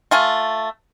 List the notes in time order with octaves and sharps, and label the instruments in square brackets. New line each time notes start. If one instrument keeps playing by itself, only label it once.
[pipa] A3 F4 G#5